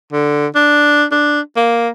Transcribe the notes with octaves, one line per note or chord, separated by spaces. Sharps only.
D3
D4
D4
A#3